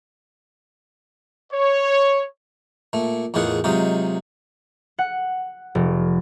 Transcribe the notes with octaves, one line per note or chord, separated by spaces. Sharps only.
C#5
A#2 A3
E2 A2 D#3 F4 G#4 F#5
C3 F#3 G#3 D#4 F4
F#5
F1